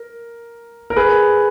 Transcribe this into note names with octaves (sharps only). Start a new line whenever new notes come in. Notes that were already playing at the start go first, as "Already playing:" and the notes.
Already playing: A#4
A#4
G#4 B4